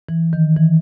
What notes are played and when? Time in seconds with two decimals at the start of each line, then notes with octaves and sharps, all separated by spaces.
0.09 E3
0.33 D#3
0.57 E3